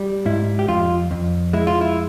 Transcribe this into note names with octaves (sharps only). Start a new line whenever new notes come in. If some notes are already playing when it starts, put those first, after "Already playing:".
Already playing: G3
G#2 E4
G4
F2 F4
F2
G#3 E4
F4
E4